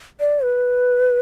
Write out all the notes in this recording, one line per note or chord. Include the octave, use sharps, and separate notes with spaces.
D5
B4